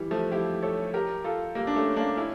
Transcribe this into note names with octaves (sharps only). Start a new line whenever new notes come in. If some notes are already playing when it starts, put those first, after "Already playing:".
Already playing: E3 G3
F3 A3
E4 G4
A4 C#5
G4 A#4
F4 A4
G3 A#3
D4
A3 C#4
A#3 D4
C#4 E4